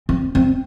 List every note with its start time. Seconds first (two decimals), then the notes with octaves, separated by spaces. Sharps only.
0.09 C4
0.35 C4